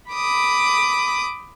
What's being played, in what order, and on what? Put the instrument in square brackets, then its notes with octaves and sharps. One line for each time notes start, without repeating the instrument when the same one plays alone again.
[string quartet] B5 D6 D#6